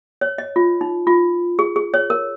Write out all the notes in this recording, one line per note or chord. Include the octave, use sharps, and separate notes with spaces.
C#5
D#5
F4
D#4
F4
G#4
G#4
C#5
A#4